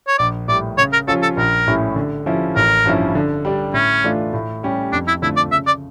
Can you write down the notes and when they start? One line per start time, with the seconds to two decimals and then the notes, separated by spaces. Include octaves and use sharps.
0.08 C#5
0.19 A#1 D5
0.48 A2 G3 D5
0.78 C#3 C#5
0.93 A#4
1.08 F3 C#4 F4 A4 C#5
1.22 A4
1.37 A#1 A#4
1.67 A2 G3 C#4 E4
1.96 D3
2.26 F3 C#4 E4
2.56 A1 A#4
2.85 G2 F3 C#4 E4
3.15 D3
3.45 G3 D4
3.74 A2 C#4
4.04 E3 A3 D4 F4
4.33 A2
4.63 G3 C#4 G4
4.92 F2 D4
5.08 E4
5.22 D3 F3 A3 E4
5.37 D5
5.51 C#3 E5
5.67 D5